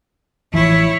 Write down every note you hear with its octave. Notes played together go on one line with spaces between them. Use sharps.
A1 E3 F3 E4 C#5